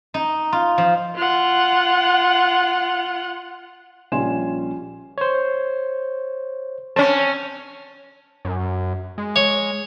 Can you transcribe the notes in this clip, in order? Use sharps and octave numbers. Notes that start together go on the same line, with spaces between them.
D#4
F4
F3
F4 F#5
A#1 G3 C#4 G#5 C6 E7
C5 C#5
C4 C#4 A5
F#2
G#3
C#5